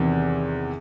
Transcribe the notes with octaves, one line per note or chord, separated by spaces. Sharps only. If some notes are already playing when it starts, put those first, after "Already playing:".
Already playing: E2 C3 D#3